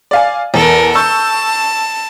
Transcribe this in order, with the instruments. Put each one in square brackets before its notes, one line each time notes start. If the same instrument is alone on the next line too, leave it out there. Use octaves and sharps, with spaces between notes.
[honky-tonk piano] D5 F5 G#5
[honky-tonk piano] E2 [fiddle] A4 A#4
[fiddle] A5 [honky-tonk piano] C#6 E6 G6